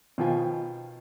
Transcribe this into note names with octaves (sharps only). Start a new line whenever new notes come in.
B2 D#3 F3 F4 G5 G#5